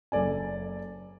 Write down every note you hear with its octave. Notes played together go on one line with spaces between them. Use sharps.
F#1 A4 D5 G#5